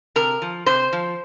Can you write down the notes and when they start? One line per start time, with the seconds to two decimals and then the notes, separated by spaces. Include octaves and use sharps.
0.16 C3 A#4
0.42 F3
0.66 C3 C5
0.93 F3